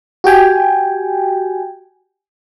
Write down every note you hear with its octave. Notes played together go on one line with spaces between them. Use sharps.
F#4 G4 G5 G#5